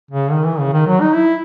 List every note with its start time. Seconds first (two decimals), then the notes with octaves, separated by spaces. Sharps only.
0.11 C#3
0.31 D#3
0.45 E3
0.60 C#3
0.73 D#3
0.87 F#3
1.01 D#4
1.15 E4